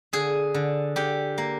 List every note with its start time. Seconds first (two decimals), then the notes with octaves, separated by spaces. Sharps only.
0.13 D3 G#4
0.54 D3
0.96 D3 G4
1.38 A#3